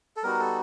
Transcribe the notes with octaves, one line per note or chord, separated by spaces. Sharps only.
A4
G3 B3 D#4 F#4 A#4
A4